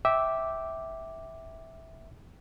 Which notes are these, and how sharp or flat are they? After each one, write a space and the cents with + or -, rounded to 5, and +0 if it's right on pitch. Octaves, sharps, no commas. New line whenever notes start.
E5 -10 G5 -10 D6 +0